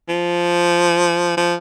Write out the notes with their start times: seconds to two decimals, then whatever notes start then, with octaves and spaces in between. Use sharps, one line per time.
0.09 F3
1.37 F3